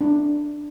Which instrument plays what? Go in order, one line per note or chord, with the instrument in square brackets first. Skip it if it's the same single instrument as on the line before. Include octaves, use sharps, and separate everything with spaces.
[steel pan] D4